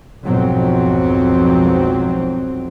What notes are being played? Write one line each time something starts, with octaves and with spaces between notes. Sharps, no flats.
B1 F2 G#2 F#3 C4